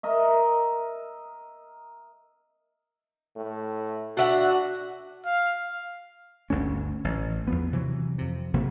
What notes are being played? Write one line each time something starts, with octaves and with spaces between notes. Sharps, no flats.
A#4 D#5 E5
A2
D4 F#4 E5 F#5
F5
G1 D2 A3 C#4
A1
E2 F3 B3
C3 E3 F#3
F2 C3
G#1 C3 F#3 A#3